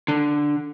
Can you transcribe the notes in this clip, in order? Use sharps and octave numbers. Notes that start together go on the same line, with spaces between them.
D3